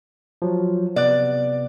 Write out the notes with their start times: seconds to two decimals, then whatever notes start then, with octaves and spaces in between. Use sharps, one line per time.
0.42 F3 F#3
0.96 C3 B3 D5 F#6